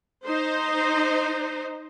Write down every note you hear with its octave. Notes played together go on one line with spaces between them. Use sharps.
D#4 C5